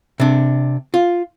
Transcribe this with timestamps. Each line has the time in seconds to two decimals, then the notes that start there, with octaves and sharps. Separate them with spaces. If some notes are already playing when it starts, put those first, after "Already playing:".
0.20 C3 D4
0.94 F4